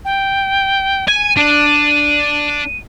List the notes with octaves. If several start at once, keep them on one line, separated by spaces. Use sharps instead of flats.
G5
G#5 D#7
D4